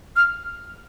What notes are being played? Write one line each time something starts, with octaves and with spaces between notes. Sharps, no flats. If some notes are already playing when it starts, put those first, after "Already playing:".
F6